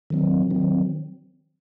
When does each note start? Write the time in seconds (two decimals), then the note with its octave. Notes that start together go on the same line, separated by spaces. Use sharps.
0.10 D#3 F#3 C4
0.50 D#3 F#3 C4